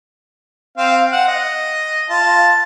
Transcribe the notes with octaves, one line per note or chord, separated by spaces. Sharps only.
C4 F5
F#5
D#5
F4 A5